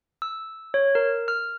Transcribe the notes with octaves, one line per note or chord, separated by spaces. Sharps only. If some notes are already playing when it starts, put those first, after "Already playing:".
E6
C#5
A#4
F6